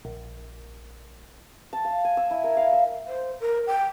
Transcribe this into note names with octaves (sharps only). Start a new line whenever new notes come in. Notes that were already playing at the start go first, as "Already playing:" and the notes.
A#1
A5
F5
G#5
E6
E4
A#4
F5
E5
C5
A#4
G5